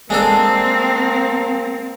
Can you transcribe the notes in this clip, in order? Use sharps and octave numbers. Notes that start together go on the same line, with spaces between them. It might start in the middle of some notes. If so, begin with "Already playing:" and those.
G#3 A#3 C4 D4 A4